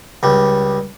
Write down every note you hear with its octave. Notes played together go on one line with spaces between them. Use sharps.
C#2 G3